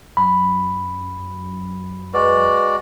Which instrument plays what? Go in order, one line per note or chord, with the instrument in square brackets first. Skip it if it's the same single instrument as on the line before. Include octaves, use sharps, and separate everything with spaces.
[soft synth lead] F#2 [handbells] B5
[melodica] G#3 F#4 D5 [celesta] B4